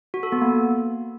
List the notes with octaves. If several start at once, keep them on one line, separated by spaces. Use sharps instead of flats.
F#4
A4
B3
A#3